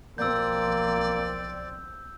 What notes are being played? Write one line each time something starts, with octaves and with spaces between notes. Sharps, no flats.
B1 F3 A#3 C4 D5 E6 G6